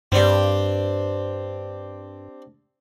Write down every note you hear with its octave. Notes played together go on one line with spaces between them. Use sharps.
G2 C4 D4 G4